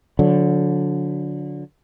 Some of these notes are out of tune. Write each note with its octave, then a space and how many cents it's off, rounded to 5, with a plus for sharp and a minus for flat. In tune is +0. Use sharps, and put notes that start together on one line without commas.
D3 -20 F#3 -45